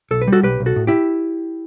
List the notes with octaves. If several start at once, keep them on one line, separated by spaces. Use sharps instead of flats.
B1 A4
B4
G3
F#4 A4
B1 G4 B4
B1
F#4 A4
A2
E4 G4